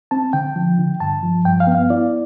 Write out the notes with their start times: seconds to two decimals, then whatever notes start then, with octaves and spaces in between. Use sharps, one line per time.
0.11 C4 A5
0.33 D3 G5
0.56 F3
0.78 D3
1.00 G2 A5
1.23 F3
1.45 G2 G5
1.60 F5
1.67 B3
1.75 F5
1.90 E4 D5